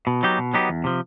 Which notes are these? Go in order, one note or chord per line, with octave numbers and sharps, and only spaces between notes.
B2
F#3 B3 D#4 G4
B2
F#3 B3 D#4 G4
E2
C3 F3